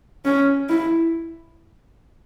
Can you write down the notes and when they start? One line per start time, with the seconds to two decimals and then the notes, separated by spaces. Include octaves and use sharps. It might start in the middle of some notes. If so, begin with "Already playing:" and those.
0.25 C#4
0.69 E4